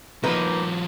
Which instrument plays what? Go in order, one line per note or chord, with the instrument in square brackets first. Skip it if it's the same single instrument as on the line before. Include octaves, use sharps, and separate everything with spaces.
[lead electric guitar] F3 F#4 [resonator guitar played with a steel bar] A#3 D#4 B4